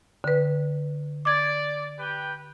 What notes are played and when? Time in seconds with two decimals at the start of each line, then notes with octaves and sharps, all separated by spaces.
0.24 D3 B4
1.25 D5 D6 G#6
1.99 G4 B4 G5